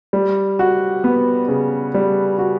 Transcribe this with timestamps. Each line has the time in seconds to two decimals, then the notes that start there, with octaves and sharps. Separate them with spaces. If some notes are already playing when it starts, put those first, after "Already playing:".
0.13 G3
0.59 F#4
1.04 B3
1.48 C#3
1.94 G3
2.39 F#4